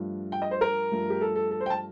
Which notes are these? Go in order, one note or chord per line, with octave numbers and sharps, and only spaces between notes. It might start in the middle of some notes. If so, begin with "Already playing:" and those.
Already playing: G2 F3 A3
G5
D#5
C5
A#4
G2 F3 A3
G4
A4
A4
A4
C5
G5
A5